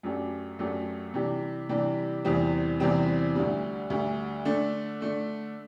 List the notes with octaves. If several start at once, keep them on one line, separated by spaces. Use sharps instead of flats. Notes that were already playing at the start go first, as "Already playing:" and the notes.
F#2 F#3 A3 D4 G4
F#2 F#3 A3 D4 G4
C3 E3 G3 D4 G4
C3 E3 G3 D4 G4
E2 C3 E3 G3 C4
E2 C3 E3 G3 C4
D2 D3 G3
D2 D3 G3
D3 A3 D4
D3 A3 D4